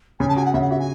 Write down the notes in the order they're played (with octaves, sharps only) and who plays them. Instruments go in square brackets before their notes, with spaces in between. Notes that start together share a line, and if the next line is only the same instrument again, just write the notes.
[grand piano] C#3 [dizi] G#5
[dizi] A5
[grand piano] F#4 [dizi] G#5
[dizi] F#5
[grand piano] C#3 [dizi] E5
[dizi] F#5
[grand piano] F#4 [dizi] E5
[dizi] G#5